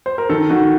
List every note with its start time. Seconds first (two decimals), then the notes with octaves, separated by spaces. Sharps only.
0.06 C5
0.18 A#4
0.30 D#3 A4
0.49 D#3 F#4